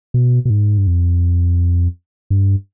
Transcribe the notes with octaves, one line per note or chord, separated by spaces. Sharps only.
B2
B2
G#2
G2
F2
G2